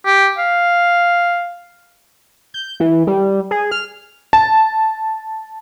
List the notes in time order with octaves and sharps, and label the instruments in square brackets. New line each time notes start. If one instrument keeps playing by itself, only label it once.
[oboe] G4
F5
[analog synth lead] G6
E3
G3
G#4
F6
[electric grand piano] A5